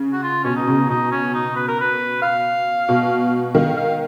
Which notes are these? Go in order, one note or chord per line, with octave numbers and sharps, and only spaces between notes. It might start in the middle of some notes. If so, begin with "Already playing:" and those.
Already playing: C#3
F#4
F4
B2 C#4
D#4
C#3
B2 D#4
C#4
D#4
B4
A#4
B4
F5
B2
D#3 F5
F5